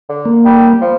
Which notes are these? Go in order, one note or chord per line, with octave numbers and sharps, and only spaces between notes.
D3
A#3
G3
F3